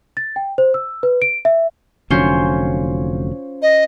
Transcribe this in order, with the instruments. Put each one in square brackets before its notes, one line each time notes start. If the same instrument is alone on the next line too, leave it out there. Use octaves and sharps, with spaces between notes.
[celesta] A6
G5
C5
E6
B4
D7
E5
[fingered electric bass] F1 D3 F#3 [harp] C#4 F4 C5
[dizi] D#5